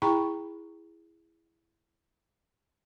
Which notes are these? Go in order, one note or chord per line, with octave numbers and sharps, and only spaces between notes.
E4 G#4 G5 A#5 B5 C#6